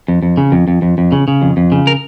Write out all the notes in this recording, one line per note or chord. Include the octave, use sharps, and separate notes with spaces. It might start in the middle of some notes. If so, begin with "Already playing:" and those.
F2
F2
C#3
F2
F2
F2
F2
C#3
C#3
F2
F2
C#3
A#4